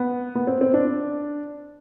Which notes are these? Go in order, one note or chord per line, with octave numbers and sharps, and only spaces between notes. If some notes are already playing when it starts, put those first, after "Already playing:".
Already playing: B3
B3
C4
C4
D4